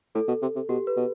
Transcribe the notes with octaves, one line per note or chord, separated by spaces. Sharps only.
A2 A4
B2
C3
C3
B2 G4
B4
B2